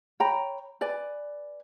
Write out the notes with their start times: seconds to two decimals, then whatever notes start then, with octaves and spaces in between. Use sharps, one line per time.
0.20 C#5 G5 A#5 B5
0.81 B4 D5 G#5